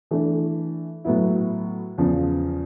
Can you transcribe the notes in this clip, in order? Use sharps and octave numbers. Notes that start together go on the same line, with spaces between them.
E3 A3 D4
A2 F#3 B3 E4
E2 C#3 F3